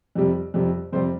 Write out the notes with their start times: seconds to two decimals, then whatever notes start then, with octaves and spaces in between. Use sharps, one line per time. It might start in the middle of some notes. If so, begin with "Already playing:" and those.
0.15 F2 C3 G3
0.54 F2 C3 G3
0.92 F2 C3 G3 C5